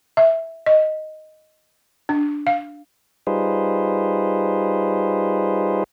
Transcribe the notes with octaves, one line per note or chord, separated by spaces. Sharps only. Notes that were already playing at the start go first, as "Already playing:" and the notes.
E5
D#5
D4
F5
G3 D#4 F4 G#4 B4 C5